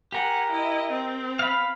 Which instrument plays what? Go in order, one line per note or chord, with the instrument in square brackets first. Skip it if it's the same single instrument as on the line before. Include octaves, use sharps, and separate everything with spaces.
[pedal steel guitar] G4 A#4 [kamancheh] F#5 G#5
[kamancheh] E4 D#5
C4
[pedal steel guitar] F5 B5